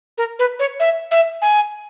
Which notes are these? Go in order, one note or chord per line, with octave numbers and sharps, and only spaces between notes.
A#4
B4
C#5
E5
E5
G#5